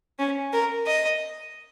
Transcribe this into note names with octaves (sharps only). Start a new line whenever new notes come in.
C#4
A#4
D#5